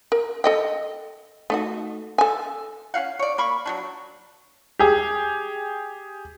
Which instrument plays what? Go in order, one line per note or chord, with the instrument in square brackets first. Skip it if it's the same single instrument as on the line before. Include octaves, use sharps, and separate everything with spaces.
[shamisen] A#4
A4 D#5 G5
A3 D#4 F#4
A4 G#5
[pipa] C#4 G4 F5 F#5
C#5 D5
A#3 B5 C#6
F#3 G3 D4
[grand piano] G4 G#4